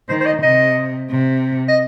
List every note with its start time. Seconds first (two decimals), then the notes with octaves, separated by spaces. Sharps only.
0.09 D#3 C5
0.21 C5
0.26 D#5
0.42 C3 D#5
1.10 C3
1.68 D#5